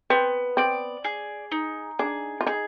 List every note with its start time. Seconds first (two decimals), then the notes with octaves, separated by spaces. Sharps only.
0.10 B3 C4
0.57 C4 D5
1.04 G#4
1.52 D#4
1.99 D4 G#4
2.41 F4
2.47 D#4 G#4